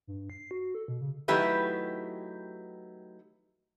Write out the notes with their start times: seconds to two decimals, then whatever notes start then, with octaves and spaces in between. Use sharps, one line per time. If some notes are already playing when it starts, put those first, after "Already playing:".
0.07 G2
0.30 C7
0.51 F#4
0.75 A4
0.88 B2
1.01 C#3
1.28 D#3 F#3 A3 E4 G4 B4